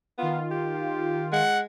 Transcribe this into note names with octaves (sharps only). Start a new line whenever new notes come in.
D#3 B3 F4
G4
G#3 F#5